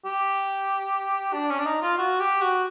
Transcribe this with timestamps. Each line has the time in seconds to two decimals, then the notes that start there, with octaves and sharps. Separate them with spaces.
0.05 G4
1.33 D4
1.50 C#4
1.59 D4
1.66 D#4
1.82 F4
1.98 F#4
2.20 G4
2.41 F#4